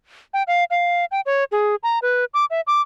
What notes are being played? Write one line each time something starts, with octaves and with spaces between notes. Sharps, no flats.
G5
F5
F5
G5
C#5
G#4
A#5
B4
D6
E5
D6